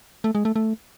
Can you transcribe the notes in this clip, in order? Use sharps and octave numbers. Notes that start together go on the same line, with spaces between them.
A3
G#3
A3
A3